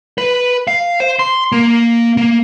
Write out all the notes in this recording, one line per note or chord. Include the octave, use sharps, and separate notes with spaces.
B4
F5
C5
C6
A#3
A#3